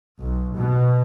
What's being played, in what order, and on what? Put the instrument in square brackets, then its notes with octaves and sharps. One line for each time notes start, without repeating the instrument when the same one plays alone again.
[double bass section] B1
B2